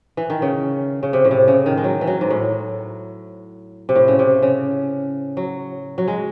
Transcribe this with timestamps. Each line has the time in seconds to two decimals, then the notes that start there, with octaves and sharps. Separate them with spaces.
0.17 E3
0.30 D#3
0.42 C#3
1.03 C#3
1.13 C3
1.25 A2
1.31 C3
1.48 C#3
1.66 D#3
1.77 G#3
1.84 F#3
2.01 E3
2.07 F#3
2.21 G#2
2.30 A2
3.89 C3
3.95 A2
4.08 C#3
4.19 C3
4.43 C#3
5.37 F#3
5.98 F#3
6.08 G#3